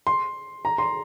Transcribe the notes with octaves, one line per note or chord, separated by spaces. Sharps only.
C6
A#5
C6